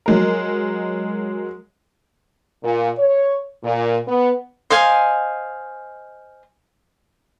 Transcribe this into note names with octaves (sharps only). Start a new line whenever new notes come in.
F#3 G#3 A#4
A#2
C#5
A#2
B3
C5 D#5 F5 G#5